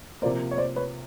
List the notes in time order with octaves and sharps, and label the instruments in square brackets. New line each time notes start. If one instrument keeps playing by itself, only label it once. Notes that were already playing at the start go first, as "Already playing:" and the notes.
[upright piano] C3 F3 A#3 [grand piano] C5 D5
[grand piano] C#5
C5 D5
B4 C#5